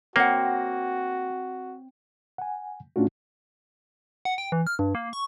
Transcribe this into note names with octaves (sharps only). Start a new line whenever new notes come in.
A#3 C4 F#4 C#5 F#5
F#5 G#5
A2 A3 C#4 D4 F4 F#4
F#5
G5
E3
F6
G2
A#3
C#6